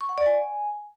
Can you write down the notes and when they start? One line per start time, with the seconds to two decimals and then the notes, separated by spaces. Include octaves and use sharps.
0.01 C#6
0.09 F#5
0.18 D5
0.26 G#5